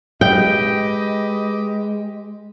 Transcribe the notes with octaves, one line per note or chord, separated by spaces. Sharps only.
G#3 G4 B4 D#5 G5